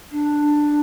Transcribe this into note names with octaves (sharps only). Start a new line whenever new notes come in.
D4